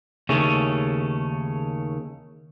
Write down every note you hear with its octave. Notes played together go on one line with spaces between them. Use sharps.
D#2 C#3 A3 C#4